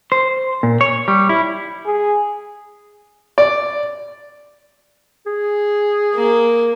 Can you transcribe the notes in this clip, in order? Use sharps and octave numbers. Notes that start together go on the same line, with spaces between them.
C5
A#2
C#5
G3
E4
G#4
D5
G#4
A#3